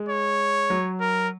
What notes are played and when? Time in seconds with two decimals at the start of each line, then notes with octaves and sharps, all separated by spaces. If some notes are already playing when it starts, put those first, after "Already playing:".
Already playing: G#3
0.09 C#5
0.70 F#3
1.01 A#4